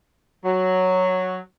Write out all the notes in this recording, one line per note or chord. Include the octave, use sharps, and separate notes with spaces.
F#3